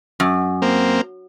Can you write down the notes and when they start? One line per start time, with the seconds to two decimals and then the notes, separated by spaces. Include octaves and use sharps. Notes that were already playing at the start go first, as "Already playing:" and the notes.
0.20 F#2
0.62 A#3 C4